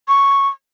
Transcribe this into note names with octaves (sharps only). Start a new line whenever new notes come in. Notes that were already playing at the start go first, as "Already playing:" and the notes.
C#6